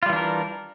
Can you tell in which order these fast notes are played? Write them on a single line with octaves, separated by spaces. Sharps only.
F4 G3 E3 D4 A#4